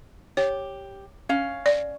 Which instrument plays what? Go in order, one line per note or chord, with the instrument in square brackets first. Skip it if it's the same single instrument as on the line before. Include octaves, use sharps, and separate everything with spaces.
[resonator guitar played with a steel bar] G4 [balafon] C#5
[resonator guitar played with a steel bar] C#4 F5
[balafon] D5